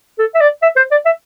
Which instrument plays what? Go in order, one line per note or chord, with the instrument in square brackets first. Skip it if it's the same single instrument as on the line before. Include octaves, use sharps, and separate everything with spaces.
[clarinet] A4
E5
D5
E5
C5
D5
E5